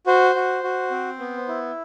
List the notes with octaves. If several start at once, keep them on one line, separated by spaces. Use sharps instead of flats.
F#4 C5
F#4
F#4
C4
B3
E4